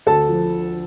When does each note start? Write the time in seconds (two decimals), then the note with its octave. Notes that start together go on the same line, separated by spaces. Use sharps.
0.06 D2 A4 A5
0.29 F3